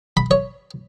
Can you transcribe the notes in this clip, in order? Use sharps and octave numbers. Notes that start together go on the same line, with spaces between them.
B5
C#5